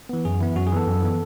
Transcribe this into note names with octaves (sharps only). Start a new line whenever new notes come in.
E3 B3
F#2 G#4
E3 B3 E4
F#2 F#4
G#4
E3 B3 A4
F#2
E3 B3